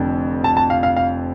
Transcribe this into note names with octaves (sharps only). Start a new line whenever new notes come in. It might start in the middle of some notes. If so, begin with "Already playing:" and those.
Already playing: F1 F2 D3 F3
A5
A5
F5
F5
F5